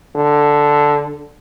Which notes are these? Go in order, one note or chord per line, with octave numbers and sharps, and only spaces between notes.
D3